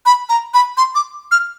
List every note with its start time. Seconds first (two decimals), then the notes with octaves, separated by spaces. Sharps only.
0.06 B5
0.29 A#5
0.54 B5
0.77 C6
0.95 D6
1.31 F6